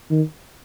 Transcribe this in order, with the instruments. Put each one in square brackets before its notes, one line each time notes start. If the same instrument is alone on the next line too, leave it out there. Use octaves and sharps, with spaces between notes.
[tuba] D#3